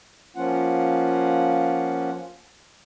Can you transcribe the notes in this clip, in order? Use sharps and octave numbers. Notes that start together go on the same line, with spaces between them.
F3 A#3 C#4 F4 F#5